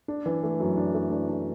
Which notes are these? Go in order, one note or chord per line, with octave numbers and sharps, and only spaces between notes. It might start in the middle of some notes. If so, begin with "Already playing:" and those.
D4
E3
A3
F#2
D4
A3
D4
D4